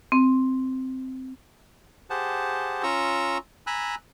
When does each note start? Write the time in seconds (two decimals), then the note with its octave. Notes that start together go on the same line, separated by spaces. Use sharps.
0.12 C4
2.10 G4 G#4 C5 F#5 A5
2.83 C#4 F4 A#5 C#6 E6
3.67 G#5 A#5 B5 E6 F#6